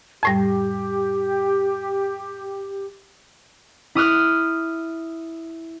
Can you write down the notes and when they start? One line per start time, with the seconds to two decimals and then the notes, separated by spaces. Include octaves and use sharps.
0.23 F2 A2 G3 G4
3.95 E4 D#6 F6 F#6